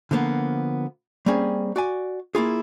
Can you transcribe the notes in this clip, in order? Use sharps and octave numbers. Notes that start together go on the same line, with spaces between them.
D3 F3 A#3 B3
G3 A#3 C4 C#4 G#4
F#4 D5 G#5
A#3 E4 F4 G#4